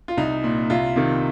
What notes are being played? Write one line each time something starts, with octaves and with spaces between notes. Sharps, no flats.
F4
C2 D#4
A#2
C2 F4
C3 D#3